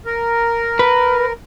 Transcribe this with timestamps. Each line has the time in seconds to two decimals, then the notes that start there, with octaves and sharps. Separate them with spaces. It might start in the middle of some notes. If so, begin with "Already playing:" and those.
0.05 A#4
0.79 B4